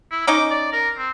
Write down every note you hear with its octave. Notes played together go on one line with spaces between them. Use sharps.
E4
C#4 D#4 D#5 D6
D5
A#4
C4